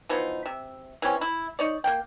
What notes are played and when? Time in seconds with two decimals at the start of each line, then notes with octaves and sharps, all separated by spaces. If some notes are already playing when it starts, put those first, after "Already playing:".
0.09 E3 F3 B3 D#4
0.46 C3 E5
1.02 E3 G3 C4 C#4
1.21 E4
1.59 D#4 C#5 D5
1.84 A#3 D4 G5